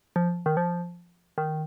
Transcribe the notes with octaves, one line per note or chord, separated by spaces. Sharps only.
F3
D#3
F3
D#3